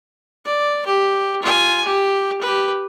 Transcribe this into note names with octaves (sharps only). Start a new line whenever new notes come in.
D5
G4
F4 G#5
G4
G4 B4